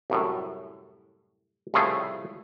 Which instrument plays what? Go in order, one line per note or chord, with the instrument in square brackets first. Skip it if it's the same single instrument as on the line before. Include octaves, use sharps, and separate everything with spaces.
[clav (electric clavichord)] C2 F#2 A2
C2 A2 C#3 F3 A3 G#4